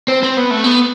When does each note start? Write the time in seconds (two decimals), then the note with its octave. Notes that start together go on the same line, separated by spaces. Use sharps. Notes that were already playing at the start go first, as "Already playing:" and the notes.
0.08 C4
0.23 C4
0.37 B3
0.51 A3
0.64 B3